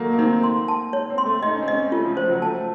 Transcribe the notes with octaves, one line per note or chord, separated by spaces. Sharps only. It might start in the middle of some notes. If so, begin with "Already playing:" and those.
Already playing: D#3 F#3 A3 A#3
A#3
C4 D#4
C6
A5
C#5
C4
C6
A3
D#4 D#5
C#4
C4
C#4 D#5
A3 F4
F3
C5
F#3
A3 A5